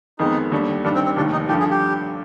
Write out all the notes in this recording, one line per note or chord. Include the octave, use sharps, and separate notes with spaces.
F2 D#3 G#3 B3 D#4
D#2 D3 G3
G2 D#3 G3 D4
C4
C4
F1 D#2 D#3 D4
D#4
G2 D3 F3 G4
G#4
G4